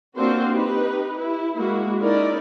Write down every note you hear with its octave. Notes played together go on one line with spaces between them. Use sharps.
A#3 C4 D4 F4 F#4 C5
D#4 G4 B4
E4
G#3 A#3 E4 F#4
C#4 D#4 E4 A#4 D5